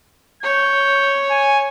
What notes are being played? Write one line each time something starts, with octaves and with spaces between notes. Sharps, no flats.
C#5 G6
G#5